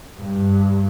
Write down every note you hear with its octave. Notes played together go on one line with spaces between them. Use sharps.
G2